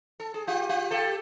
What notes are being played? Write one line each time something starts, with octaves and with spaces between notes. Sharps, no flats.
A4
G#4
F4 G4
F4 G4
G4 A4